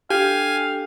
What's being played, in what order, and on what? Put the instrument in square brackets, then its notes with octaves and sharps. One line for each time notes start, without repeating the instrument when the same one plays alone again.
[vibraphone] D4 A4 G5 [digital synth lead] G4 [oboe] F5 [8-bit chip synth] G#5